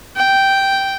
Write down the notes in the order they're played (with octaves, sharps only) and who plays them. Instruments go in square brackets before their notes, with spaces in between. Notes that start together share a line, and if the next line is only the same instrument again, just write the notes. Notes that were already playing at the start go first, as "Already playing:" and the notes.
[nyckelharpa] G5